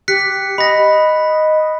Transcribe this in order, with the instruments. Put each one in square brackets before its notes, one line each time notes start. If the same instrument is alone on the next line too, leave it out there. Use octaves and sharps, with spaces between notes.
[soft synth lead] G4 [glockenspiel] F#6 B6 C#7
[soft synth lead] D#5 [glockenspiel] B5 A#6